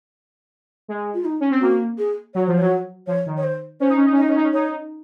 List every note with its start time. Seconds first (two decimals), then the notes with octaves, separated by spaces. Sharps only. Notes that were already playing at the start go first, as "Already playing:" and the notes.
0.88 G#3
1.14 F4
1.25 D#4
1.40 C#4
1.51 C4
1.61 A#3 F#4
1.98 G#4
2.35 F#3 C#5
2.47 F3 C5
2.58 F#3 C#5
3.07 F3 C#5
3.26 D#3
3.37 C#5
3.43 C5
3.80 C#4 C5
3.89 D#4
3.96 C#4
4.05 D#4
4.12 C#4
4.17 D#4 D#5
4.29 C#4
4.36 D#4
4.44 C#4
4.53 D#4 C#5